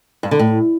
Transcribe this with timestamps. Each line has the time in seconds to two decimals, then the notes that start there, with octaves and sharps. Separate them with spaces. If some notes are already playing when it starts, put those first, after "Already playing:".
0.23 G2
0.31 D3
0.39 A2